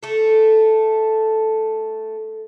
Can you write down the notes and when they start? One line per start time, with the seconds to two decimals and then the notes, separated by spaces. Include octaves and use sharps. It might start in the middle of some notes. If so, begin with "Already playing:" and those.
0.03 A3 A4